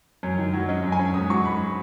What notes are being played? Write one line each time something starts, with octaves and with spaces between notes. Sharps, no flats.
F#2 C#5
D#3
F#3
C#4 D#5
F#2
G#5
C#4
G#2 D#6
F#3 C#6
G#2 B5